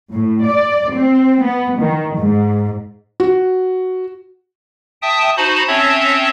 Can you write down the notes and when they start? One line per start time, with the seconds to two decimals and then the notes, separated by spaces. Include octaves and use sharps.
0.11 A2
0.44 D5
0.92 C4
1.42 B3
1.80 D#3
2.16 G#2
3.20 F#4
5.02 E5 G5 A5 D#6
5.37 D#4 F#4 C5 A5 B5
5.67 C4 C#4 C#5 E5 A5 G#6